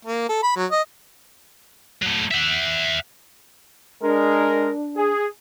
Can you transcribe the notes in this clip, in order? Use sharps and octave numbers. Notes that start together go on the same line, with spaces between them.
A#3
A4
B5
F#3
D#5
F#3 A3
E5 F#5
G#3 D4 A#4
G#4